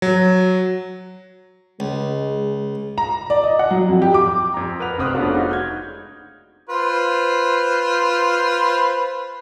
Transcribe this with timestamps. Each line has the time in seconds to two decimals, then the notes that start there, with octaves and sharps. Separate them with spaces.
0.02 F#3
1.80 C#2 G#3
2.98 A#5
3.30 D5
3.44 D#5
3.59 F#5
3.70 F#3
3.89 F2
4.02 G4
4.14 D6
4.54 F2 A#5
4.80 A#4 B4 F#5 F7
4.98 F1 C4 D#6 F6 F#6
5.15 A3 B3 C#4 D4 F4 F#4
5.34 G#3 D#4 F#4
5.49 F6 G6 G#6
6.69 F4 B4 C5